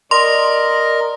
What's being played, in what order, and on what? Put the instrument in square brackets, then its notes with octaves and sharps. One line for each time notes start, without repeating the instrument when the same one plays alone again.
[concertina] A#4 D#5 [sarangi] D5 [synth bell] C6